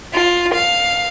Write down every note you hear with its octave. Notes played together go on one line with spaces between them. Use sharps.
F4
F5